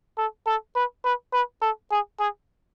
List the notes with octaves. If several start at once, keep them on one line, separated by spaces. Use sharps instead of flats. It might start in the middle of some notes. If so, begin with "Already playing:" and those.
A4
A4
B4
B4
B4
A4
G#4
G#4